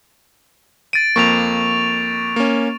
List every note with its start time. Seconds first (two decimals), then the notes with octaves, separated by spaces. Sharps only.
0.93 A6 D7 D#7
1.16 F2 A#3 C#6 F7
2.36 A#3 C#4